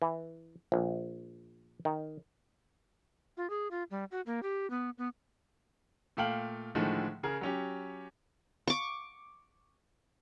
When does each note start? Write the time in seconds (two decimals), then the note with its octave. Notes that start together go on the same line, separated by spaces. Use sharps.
0.02 E3
0.72 A#1
1.85 D#3
3.37 F4
3.50 G#4
3.71 F4
3.91 G3
4.11 F#4
4.26 A#3
4.43 G4
4.70 B3
4.98 B3
6.17 A#2 A3 F5 G5 F#7
6.75 A2 D3 D#3 F3 G#3 A3
7.23 C#3 G#4 A#4
7.41 F#3 C#4 G4
8.68 C#6 D6